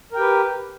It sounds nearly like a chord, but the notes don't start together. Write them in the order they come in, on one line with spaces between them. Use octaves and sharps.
A#4 G5 G4 B4